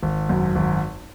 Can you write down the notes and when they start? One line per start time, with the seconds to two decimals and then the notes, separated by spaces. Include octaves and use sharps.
0.02 G#1
0.29 F#2
0.55 G#1